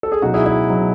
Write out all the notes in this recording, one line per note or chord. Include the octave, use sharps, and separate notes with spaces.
A4
G#4
C#2 B2 F#3 D#4 F#4
E4 G#4
E4 G#4
B2 F#3